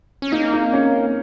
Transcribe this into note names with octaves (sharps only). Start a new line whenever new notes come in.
C#4
A#3 D#4
D#4
C#4